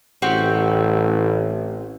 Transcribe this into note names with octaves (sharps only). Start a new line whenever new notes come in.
A1 C4 F#4 G4